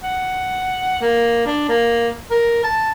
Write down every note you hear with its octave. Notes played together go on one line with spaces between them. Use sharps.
F#5
A#3
D4
A#3
A#4
A5